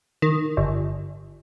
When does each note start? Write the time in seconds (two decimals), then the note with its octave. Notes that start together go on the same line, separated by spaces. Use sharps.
0.22 D#3
0.57 G1